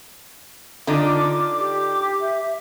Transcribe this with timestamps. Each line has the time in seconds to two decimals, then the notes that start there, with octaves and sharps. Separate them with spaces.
0.87 D3 D4 D#4 F4 D6
1.59 G4
2.21 E5